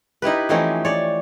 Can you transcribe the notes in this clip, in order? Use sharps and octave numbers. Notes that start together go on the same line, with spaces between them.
D#4 E4 G4 B4
E3 F3 A3 C4 C#4 D#4
C#5 D5